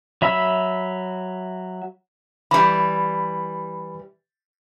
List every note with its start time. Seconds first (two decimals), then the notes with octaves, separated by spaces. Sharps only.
0.22 F#3 E5 B5 E6
2.51 E3 G3 B5